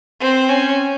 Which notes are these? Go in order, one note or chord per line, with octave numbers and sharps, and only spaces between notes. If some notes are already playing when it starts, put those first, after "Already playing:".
C4
C#4